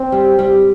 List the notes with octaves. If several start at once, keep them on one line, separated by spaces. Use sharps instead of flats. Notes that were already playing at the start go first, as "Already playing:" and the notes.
Already playing: C4
G3
G3